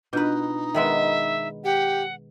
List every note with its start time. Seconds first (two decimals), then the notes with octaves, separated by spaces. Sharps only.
0.13 B2 D4 D#4 F4 B4 G6
0.74 D#3 G#3 B3 E5
1.64 G4 F#5